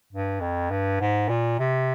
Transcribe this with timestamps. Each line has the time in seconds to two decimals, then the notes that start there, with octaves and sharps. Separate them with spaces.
0.12 G2
0.41 F2
0.71 G2
1.00 G#2
1.29 A#2
1.59 C3